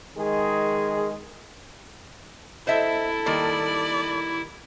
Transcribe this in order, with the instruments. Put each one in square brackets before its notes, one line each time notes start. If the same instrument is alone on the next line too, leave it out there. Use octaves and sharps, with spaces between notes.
[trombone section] D#3 G#3 G#4
[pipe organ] E4 [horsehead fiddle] A4 [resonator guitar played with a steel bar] C5 D#5 E5
[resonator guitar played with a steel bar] D#3 G3 A#3 [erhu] D5